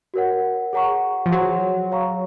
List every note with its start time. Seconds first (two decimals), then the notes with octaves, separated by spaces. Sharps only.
0.14 F#4 A#4 C#5 F#5
0.73 G#4 C#5 F#5 A#5 C#6
1.26 F3
1.32 F#3 G#4 C5 F#5 C6
1.92 C#5 F5 A#5 C#6